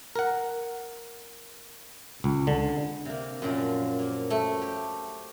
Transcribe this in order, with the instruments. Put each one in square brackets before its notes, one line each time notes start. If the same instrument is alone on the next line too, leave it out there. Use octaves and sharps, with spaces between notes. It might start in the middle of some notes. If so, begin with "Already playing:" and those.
[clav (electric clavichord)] A#4 F#5
C#2
D3
[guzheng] C3 A#3
F#2 A#2 F3
A#3
A3
G4